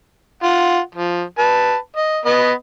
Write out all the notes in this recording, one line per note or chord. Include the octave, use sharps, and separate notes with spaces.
F4 F#5
F3
B4 A5
D#5
B3 B4 D#5